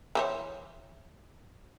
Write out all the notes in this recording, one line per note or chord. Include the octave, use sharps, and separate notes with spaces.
E3 C5 C#5